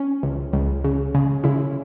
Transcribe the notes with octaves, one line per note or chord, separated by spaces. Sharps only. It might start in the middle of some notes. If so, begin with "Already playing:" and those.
Already playing: C#4
C#2
C#2
C#3
C#3
C#3 E4